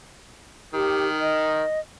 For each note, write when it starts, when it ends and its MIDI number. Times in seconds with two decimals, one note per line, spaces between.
0.74 1.61 51
0.74 1.07 67
1.21 1.80 75